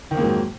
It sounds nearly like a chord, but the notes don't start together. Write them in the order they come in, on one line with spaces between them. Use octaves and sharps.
D#3 F2 A#3 G#2 F#3